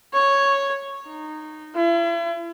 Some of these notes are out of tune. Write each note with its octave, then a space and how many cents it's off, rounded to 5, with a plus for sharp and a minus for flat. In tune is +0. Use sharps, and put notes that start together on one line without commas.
C#5 -5
D#4 -15
E4 +40